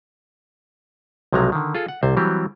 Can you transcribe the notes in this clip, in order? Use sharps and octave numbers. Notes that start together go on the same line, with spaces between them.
B1 C3 F3 F#3 G#3 A#5
D3 D#3
F4 G#4 A4
F#5
C2 C3 C5
E3 F#3 G3 C4 G4